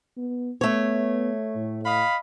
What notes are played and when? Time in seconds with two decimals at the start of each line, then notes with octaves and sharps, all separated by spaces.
0.17 B3
0.61 A3 B3 C#5
1.55 A2
1.86 D#5 F5 B5